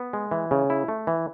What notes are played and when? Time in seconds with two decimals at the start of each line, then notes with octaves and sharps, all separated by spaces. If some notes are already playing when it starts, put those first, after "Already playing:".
Already playing: B3
0.13 G#3
0.31 E3
0.51 C#3
0.70 E4
0.88 A3
1.07 E3